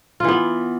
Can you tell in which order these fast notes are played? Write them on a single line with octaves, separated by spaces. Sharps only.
F4 E3 B3